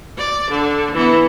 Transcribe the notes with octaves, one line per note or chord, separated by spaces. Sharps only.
D5
D3
E3 B3